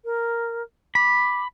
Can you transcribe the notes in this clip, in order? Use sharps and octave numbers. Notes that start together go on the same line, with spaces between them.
A#4
B5 D6